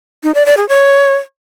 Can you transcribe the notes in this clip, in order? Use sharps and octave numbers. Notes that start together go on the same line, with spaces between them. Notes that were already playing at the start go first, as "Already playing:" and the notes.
D#4
D5
D5
G#4
C#5